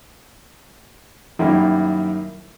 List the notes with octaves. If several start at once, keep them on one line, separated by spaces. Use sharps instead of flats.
F#2 D#3 G3 A#3 E4